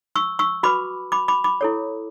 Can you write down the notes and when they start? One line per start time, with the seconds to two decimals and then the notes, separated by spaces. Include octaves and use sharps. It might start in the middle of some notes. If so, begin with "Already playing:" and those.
0.16 C#6 E6
0.39 C#6 E6
0.63 F#4 B4 B5 D6
1.12 B5 D6
1.28 B5 D6
1.44 B5 D6
1.61 E4 A4 C#5